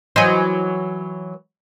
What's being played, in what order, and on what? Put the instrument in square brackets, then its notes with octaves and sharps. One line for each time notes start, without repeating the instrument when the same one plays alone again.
[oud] E3 F#3 [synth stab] C5 D#5 G#5